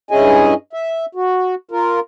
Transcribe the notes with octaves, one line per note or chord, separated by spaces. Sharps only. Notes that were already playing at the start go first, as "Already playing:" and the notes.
G2 C#4 E4 G#4 D#5 G#5
E5
F#4
F4 A#4